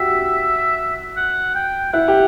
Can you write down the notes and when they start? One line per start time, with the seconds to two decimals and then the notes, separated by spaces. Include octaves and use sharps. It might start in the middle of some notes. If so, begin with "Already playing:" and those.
Already playing: F#4 G4 E5
1.17 F#5
1.55 G5
1.93 E4 F#5
2.08 G4